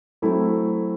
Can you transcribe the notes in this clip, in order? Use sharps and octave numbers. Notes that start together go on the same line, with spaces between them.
F#3 A3 C4 E4 A4